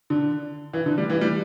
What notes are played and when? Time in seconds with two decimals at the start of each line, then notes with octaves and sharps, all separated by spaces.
0.10 D3
0.73 E3
0.86 D3
0.98 G3
1.10 E3
1.21 G3